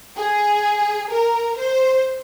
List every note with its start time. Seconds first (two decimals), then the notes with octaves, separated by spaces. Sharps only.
0.17 G#4
1.11 A#4
1.57 C5